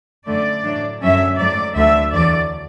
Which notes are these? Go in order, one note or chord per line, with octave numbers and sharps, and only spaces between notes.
F#2 D3 A3 D5
A2 F#3 A3 D4
F#2 D3 F#3 C#4 E5
G#2 F#3 A3 D5
D2 D3 A3 D4 E5
E2 D3 F#3 D5